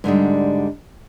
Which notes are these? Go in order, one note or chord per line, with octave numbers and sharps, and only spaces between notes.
G#2 D3 G3 G#3